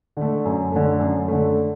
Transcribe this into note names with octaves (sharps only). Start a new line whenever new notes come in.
D3 A3
F#2
D3 A3
F#2
D3 A3